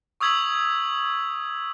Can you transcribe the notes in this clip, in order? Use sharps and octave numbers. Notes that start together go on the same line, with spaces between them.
C#6 D#6 E6 G#6 B6 F#7